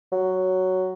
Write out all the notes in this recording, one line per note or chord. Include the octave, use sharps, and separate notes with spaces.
F#3